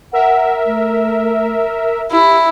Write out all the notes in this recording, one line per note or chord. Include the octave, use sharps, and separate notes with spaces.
A#4 E5 F#5
A3
E4 G4